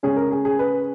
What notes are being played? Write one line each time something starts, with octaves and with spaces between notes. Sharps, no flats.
C#3 G#3 C#4 G#4
A#4
G#4
G#4
B4